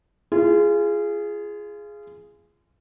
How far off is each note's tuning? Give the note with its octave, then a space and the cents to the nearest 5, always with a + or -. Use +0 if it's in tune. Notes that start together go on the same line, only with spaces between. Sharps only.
F4 -30 G#4 +0